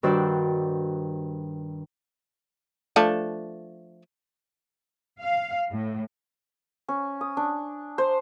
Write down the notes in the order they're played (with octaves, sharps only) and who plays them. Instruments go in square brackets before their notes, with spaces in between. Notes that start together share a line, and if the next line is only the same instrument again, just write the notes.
[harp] G2 D#3 F#4 C5 D5 E6
[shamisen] F3 A3 D4
[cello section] F5
A2
[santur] C#4
D#6
D4
C5